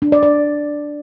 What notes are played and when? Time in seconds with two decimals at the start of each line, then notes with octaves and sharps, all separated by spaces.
0.02 D4
0.12 D5
0.23 D5